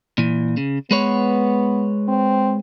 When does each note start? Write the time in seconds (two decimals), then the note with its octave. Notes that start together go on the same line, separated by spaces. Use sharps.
0.18 A#2 E3
0.57 C#3
0.91 G#3 B3 B4 C#5
2.08 C4